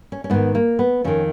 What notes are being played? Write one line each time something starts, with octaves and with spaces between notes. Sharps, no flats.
C#4
C#4
G#2 D#3 B3
A#3
B3
F2 D#3 C#4